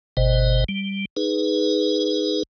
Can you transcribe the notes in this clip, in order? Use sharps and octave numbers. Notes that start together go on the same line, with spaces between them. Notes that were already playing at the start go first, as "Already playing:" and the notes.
G1 B2 C5 D#5
G3
D#4 G#4 B4